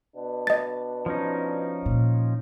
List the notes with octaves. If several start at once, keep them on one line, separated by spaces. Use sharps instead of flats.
B2 D4
D#5 A6
F3 C#4 D#4
A#2